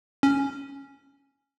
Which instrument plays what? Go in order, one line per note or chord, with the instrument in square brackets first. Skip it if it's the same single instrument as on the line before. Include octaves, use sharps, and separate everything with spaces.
[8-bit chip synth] C#4